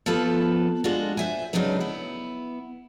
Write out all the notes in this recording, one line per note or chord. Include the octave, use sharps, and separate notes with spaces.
F3 B3 F4 A4 B4
G#3 D4 F4 F#4
C5 E5 G#5
C#3 F#3 G#3 D4 D#4 B4
B3 E4